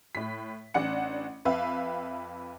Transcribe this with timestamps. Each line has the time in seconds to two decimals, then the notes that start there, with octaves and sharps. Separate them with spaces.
0.15 A2 B6
0.74 A1 D4 F#5 C#7
1.45 F2 B4 E5 F5 G5